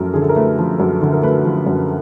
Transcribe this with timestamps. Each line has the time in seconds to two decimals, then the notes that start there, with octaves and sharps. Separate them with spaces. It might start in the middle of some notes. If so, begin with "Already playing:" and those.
Already playing: F#2 F3 A3 A#4
0.14 D3 G#4
0.22 A4
0.29 A#4
0.36 A3 B4
0.59 F3
0.79 F#2
1.02 D3
1.13 A#4
1.22 A3 B4
1.45 F3
1.66 F#2